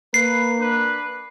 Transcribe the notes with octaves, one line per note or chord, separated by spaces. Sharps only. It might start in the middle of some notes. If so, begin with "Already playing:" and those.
A#3 B4 C7
D4 B4